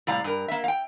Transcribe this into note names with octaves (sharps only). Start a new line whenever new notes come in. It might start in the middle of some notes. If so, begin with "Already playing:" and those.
A2 C3 G3 D5 F5 A#5
G2 A#4
A#3 E5
F5 G5